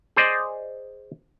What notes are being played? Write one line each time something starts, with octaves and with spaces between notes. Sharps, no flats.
G#4 C5 D5 D#5